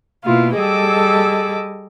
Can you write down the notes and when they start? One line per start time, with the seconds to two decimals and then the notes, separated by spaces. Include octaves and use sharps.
0.25 B2 A#3 E4 F4
0.56 G3 G#4 A4 D#5 D6 E6